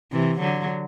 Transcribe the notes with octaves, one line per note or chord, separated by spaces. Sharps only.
C3 E3
D3 F#3